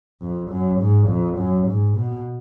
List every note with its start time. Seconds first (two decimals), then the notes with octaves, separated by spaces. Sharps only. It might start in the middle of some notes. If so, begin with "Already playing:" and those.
0.22 F2
0.51 F#2
0.80 G#2
1.08 F2
1.38 F#2
1.68 G#2
1.97 B2